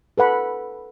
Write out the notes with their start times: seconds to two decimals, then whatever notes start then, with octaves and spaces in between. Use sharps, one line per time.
0.18 A4 B4 F#5 B5